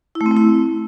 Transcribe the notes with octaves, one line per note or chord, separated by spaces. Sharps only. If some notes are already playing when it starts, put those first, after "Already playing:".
E4
A3
C4
A3
E4